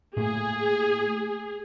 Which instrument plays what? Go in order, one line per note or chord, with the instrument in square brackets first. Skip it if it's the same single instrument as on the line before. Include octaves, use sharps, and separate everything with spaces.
[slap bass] A2 A3 A#3 [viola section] G#4